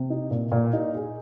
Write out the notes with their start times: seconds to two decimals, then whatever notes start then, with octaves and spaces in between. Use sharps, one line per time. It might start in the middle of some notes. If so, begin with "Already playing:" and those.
Already playing: C3
0.10 D#4
0.31 A#2
0.52 A#2
0.73 D#4
0.95 G#4